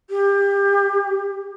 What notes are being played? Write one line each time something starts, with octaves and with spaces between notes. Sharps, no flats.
G4